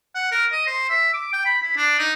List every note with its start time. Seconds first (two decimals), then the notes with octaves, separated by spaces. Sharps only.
0.15 F#5
0.32 A#4
0.52 D#5
0.67 C5
0.89 E5
1.13 D6
1.33 G5
1.45 B5
1.62 E4
1.77 D4
1.99 D#4